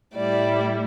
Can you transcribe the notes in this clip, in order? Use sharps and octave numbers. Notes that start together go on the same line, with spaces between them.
A2 G3 E4 D5